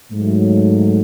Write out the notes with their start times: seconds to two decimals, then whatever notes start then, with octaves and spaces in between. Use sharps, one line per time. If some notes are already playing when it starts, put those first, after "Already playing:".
0.11 G#2 F#3 A3